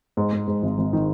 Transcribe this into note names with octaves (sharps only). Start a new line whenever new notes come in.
G#2
G#2
G#2
G#1
G#1
D#3